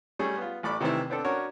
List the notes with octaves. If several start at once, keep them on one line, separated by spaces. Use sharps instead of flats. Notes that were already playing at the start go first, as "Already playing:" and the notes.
G3 A3 C#4 G#4
B3 F4
A1 A3 D5 B5 D6
C3 D#3 E3 A3 C4 E4
B3 C4 D4 A4
C#4 D4 F#4 A#4 C#5